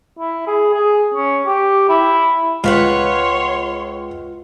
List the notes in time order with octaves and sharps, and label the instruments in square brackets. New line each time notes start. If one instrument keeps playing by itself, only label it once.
[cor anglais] E4
G#4
G#4
C#4
G4
E4
[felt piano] C#2 [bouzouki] F4 B4 F#5 [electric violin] C#5 C6